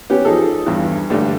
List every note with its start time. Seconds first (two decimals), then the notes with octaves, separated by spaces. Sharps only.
0.10 B3 C#4 G4
0.25 F3 D#4 G#4 A4
0.66 E2 G2
1.10 G2 D3 G3 A3